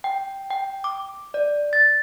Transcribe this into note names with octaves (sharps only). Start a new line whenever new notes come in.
G5
G5
D6
D5
A6